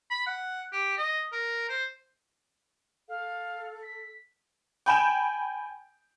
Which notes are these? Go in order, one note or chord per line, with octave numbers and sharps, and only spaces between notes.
B5
F#5
G4
D#5
A#4
C5
A4 F5
B6
G5 G#5 B5 G6 D7 E7